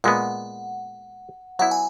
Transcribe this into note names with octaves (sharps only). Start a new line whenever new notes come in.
A#2 G#3 B3 F#5
F#3 B3 E4 F#5
G#5